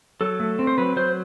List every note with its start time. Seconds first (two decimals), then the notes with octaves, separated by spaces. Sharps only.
0.21 F#3 A4
0.40 A3
0.59 C4
0.67 C5
0.78 F#3 B4
0.96 F#3 C5